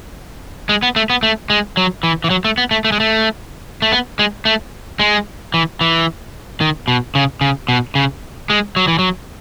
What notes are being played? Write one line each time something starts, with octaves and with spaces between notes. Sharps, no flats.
G#3
B3
A3
B3
A3
G#3
F#3
E3
E3
F#3
A3
B3
A3
A3
G#3
A3
A3
B3
G#3
A3
G#3
E3
E3
D#3
B2
C#3
C#3
B2
C#3
G#3
F#3
E3
F#3